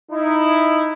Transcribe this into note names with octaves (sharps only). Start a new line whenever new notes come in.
D#4 E4